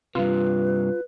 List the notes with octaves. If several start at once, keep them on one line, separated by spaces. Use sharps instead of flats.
G2 C3 F4 B4